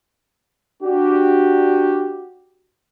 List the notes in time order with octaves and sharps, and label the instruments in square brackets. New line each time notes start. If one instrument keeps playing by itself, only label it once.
[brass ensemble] D4 F#4 G4